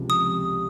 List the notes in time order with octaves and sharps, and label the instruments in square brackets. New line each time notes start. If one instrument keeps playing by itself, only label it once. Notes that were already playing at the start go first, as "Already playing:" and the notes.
Already playing: [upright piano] C#2 C3 F3
[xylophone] D#6